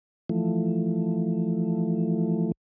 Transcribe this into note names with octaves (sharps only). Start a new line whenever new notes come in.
E3 F3 A3